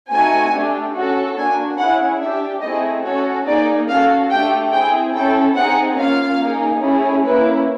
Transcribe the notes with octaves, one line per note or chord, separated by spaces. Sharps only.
A3 C4 D#4 F#4 G#5
A3 D4 G4
C#4 F#4 A4
A#3 D4 F#4 G#5
C#4 E4 G#4 F#5
D4 G4 E5
A3 C4 E4 G#4 D#5
C#4 F#4 A4 C#5
A#3 D#4 G#4 D5
C#4 F#4 A4 F5
A3 D4 G4 G5
C4 E4 G#4 G5
C#4 E4 A4 G5
C4 D#4 G#4 F#5
A#3 C#4 F4 F5
A#3 D#4 G#4
A3 C#4 E4 G#4
A#3 C#4 E4 B4